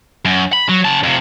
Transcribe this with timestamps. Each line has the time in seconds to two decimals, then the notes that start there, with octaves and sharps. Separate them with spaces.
0.25 F#2
0.53 B5
0.69 F#3
0.85 C#3 A5
1.03 F2 C3